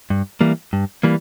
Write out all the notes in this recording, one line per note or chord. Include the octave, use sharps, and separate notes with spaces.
G2
E3 G3 A#3
G2
E3 G3 A#3